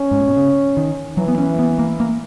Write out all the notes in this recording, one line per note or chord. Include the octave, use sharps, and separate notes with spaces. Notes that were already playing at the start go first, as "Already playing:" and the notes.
Already playing: C#4
G#2
A#2
B2
C#3
D#3
E3 F#3
B3
C#4
B3
A#3
A#3